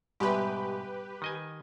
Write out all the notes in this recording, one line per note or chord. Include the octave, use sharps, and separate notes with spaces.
G#2 B2 G3 G4 B4 E5
D#3 D#5 G#5